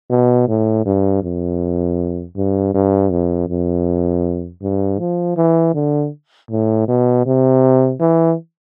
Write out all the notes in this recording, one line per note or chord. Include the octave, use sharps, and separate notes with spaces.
B2
A2
G2
F2
G2
G2
F2
F2
G2
F3
E3
D3
A2
B2
C3
E3